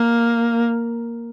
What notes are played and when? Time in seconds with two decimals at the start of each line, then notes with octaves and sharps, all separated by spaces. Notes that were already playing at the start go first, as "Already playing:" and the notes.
Already playing: A#3